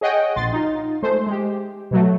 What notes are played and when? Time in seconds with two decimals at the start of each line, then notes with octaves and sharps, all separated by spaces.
0.01 G#4 C#5 D#5 F#5 G5
0.36 A#1 C6 A6
0.53 D#4 F4
1.03 G#3 A3 C5
1.27 G#3 G4
1.91 B2 F#3 A3